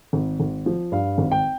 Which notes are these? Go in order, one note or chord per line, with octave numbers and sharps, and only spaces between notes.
G#1
G#1
F3
G2 F5
G#1
G5